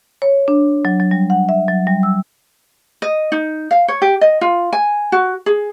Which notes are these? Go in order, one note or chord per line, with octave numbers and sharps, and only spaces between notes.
C#5
D4
F#3
F#3
G3
F#5
E5
F#3
G3
E6
D#5
D#4
F5
C#5
G4
D#5
F4
G#5
F#4
G#4